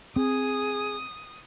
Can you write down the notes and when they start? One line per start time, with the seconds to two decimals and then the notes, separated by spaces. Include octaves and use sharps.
0.16 C4 G#4 D#6